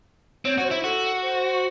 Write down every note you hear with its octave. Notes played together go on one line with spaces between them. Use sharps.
C4 C#5
F#4 C#5
C5
E4
F#4 A4
C5